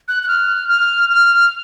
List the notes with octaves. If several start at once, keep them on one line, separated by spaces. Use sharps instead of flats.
F#6
F#6
F6
F6
F6